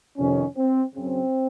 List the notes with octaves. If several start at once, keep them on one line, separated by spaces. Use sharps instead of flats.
F2 C3 D#3 C#4
C4
F#2 C#3 C4